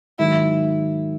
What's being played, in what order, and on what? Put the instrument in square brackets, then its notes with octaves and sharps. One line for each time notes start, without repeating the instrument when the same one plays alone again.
[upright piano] G#2 D#3 F#3 [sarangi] E4